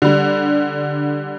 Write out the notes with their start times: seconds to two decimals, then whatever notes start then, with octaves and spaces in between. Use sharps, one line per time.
0.02 D3 G3